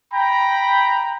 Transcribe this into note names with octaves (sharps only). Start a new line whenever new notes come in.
G5 A#5 B5